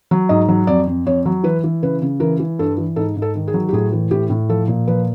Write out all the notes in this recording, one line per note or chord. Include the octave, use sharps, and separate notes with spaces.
F#3
G#2 D#5
F#3
F2 D5
F2
F2 C#5
F#3
E3 B4
E3
C#3 B4
C#3
E3 A#4
E3
G2 A4
E3
G#2 A4
G#2
A4
D#3
G#4
F#3
G4
A2 G#4
E3
A2 G4
A2
F3 A4
A#2
F3 B4